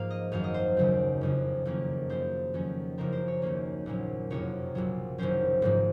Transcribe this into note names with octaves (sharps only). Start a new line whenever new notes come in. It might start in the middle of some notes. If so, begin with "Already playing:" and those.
Already playing: G#2 F3 A#3 F5
D#5
G#1 F#2 D#3 F#3 F5
D#5
C5
D#2 C#3 F#3 C4
F#1 F2 C#3
F#1 F2 D#3 A#3 C#4
F#2 C#3 F3 C5
F2 D#3 F#3 C#4
F#1 F#2 C#3 F3 C4 A#4
C5
C#5
D#2 D#3 A#3 C#4
A#1 A#2 F#3 A#3 C#4
F#1 F2 C3 F#3 C#5
A#1 A#2 F#3
F#1 F#2 D#3 F#3 C#4 C5
G#1 G#2 F3 G#3 C4